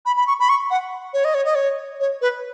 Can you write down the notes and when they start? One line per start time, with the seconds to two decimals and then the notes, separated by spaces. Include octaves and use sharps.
0.06 B5
0.17 B5
0.27 C#6
0.40 B5
0.49 C#6
0.71 F#5
1.14 C#5
1.25 D#5
1.34 C#5
1.45 D#5
1.55 C#5
2.00 C#5
2.21 B4